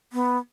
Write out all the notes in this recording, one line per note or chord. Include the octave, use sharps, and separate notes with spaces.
B3